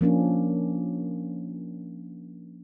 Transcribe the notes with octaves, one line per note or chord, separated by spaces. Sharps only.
F3 A#3 C#4 D4